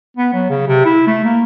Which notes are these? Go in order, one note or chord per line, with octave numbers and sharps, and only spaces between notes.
B3
F#3
C#3
C3
E4
A3
A#3